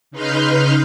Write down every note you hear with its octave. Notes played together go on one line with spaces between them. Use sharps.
C#3 D#4 B4 C6 F6 G6